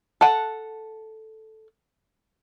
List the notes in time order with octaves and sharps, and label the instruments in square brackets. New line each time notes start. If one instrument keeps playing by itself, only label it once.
[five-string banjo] A4 F#5